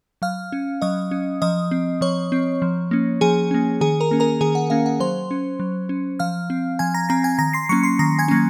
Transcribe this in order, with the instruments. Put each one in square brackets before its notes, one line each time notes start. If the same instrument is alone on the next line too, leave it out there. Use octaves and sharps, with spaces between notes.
[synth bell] F#3 F5 F6
C#4
F#3 D#5 D#6
C#4
F3 D#5 D#6
C4
F3 C#5 C#6
C4
F3
A#3 C#4
F3 G#4 G#5
A#3 C#4
D#3 G#4 G#5
A#4 A#5
A#3 C#4
A#4 A#5
D#3 G#4 G#5
F#5
A#3 C#4 F5
F#5
F#3 C5 C6
C#4
F#3
C#4
F3 F5 F6
C4
F3 G#5 G#6
A#5 A#6
C4 A#5 A#6
G#5 G#6
D#3 A#5 A#6
C6 C7
F#3 A#3 C#4 C#6 C#7
C6 C7
D#3 A#5 A#6
G#5 G#6
F#3 A#3 C#4